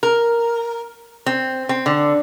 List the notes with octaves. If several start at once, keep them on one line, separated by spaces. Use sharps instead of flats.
A#4
C4
C4
D3